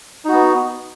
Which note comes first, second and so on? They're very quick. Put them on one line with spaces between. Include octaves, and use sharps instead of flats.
D#4 F#4 B3